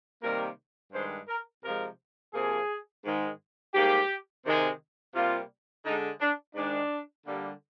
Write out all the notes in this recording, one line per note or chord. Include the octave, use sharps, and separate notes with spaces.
C3 D#3 G3 A#3 A#4
G2 D#3 G#3 C5
A#4
C3 F3 G#3 A#4
C3 F3 A#3 G#4
G#2 D#3 G#3
G#2 G3 A#3 G4
C3 D#3 G#3
C3 G3 A#3 F4
D3 G#3 D#4
D4
G#2 D#3 G#3 D4
D3 G3 A#3